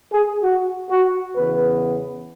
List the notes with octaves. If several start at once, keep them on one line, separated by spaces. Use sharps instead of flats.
G#4
F#4
F#4
E2 C#3 E3 B3 B4